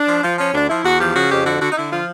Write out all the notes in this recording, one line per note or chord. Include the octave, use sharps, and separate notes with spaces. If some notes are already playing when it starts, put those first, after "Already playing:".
Already playing: D4
F3
F3
F3 C#4
D2 D4
F3 E4
E2 F#4
F3 G4
C#3 F#4
F2 G4
D3 F#4
D3 F#4
D#4
D3 E4
F3 F4